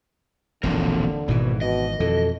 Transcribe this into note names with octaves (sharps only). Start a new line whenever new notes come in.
E1 A#1 D#2 D3 E3 C4 A#4
G#1 G#2 B2 E3
B2 D#5
F2 B2 E3 A4